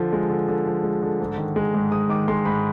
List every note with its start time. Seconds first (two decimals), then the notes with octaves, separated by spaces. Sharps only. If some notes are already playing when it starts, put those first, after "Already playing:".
Already playing: D3 F3
0.13 G#3
0.30 D3
0.48 D3
0.66 F3
0.83 G#3
1.03 D3
1.20 G#2
1.38 D#3
1.56 G#3
1.74 G#2
1.91 G#2 D#6
2.09 D#3 D6
2.28 G#3 C6
2.45 G#2 B5